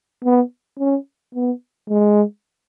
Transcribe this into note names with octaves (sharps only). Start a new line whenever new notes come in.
B3
C#4
B3
G#3